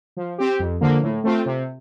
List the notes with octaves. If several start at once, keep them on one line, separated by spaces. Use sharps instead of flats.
F3
C4 G4
F2
D3 F3 A#3
A2
A3 C4 F4
C3